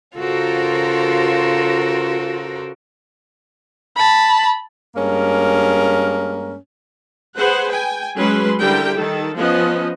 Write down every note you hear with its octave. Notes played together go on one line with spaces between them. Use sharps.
C#3 F4 F#4 A4 A#4 C5
A5 B5
G2 G#3 A#3 C#4 A#4
G#4 B4 C5 F#5
G5 G#5
F#3 G#3 C#4 G#4 B4 C6
D3 G3 E4 G4 A#4 G5
D#3 A4
F3 B3 C#4 D#5